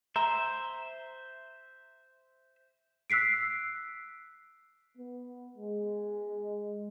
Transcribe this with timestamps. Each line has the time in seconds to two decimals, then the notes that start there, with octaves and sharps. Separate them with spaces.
0.16 C5 E5 A#5
3.10 E6 F#6 B6 C7 D7
4.97 B3
5.56 G#3